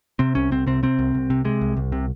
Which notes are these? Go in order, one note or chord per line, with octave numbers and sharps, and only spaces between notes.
C3 C4
C2 C#4
C2 C4
C3 C4
C3 C4
C2
C2
C3
C3 G#3
C2
C2
C3